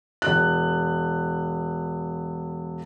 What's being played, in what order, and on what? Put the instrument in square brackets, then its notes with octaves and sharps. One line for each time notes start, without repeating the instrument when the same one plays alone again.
[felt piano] E1 F#6